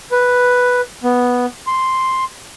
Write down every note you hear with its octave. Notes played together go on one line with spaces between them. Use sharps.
B4
B3
C6